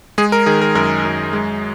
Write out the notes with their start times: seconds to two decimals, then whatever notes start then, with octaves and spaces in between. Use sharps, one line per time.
0.18 G#3 G#4
0.32 A#4
0.46 D#3 G#4
0.61 A#4
0.75 F#2 A#4
1.05 F#2
1.33 G#3